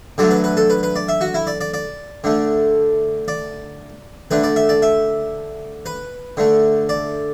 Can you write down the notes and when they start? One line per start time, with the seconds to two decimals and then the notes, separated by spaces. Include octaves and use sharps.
0.18 D3 F#3 A3 D5
0.31 B4
0.44 B4
0.57 A4
0.70 B4
0.83 B4
0.96 D5
1.09 E5
1.21 F#4
1.34 E4
1.47 D5
1.61 D5
1.74 D5
2.24 D3 A3
3.28 D5
4.31 D3 A3 B4
4.44 D5
4.56 E5
4.69 D5
4.82 E5
5.86 B4
6.37 D3 A3
6.89 D5